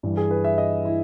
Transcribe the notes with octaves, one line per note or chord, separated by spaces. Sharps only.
G2 E3
G#4
B4
E5
D#5
E4